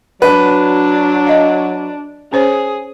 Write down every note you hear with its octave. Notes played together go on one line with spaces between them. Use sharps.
F#3 D4 B4
D#5 F5
C#4 G#4 C5 C#5